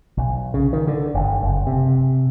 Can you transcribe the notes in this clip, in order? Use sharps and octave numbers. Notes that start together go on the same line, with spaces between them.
B1
C#3
D#3
D3
G1
F#1
C3